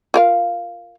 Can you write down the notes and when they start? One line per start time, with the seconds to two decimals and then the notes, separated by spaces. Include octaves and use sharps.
0.14 F4 A#4 F5